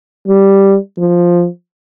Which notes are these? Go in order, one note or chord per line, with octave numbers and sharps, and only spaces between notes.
G3
F3